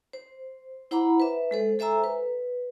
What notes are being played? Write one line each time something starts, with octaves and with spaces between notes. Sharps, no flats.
C5
E4 C5 F#5 A#5 B5 D6
B4 E5
G#3 A4 C5
A4 C5 E5 G#5 A#5 E6
B4